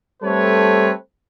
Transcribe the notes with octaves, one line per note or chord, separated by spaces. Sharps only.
G3 A3 C4 A4 B4 C#5